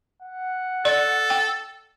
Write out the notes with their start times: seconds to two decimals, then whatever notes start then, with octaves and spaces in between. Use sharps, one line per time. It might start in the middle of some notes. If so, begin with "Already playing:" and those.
0.22 F#5
0.85 A4 D5
1.30 G5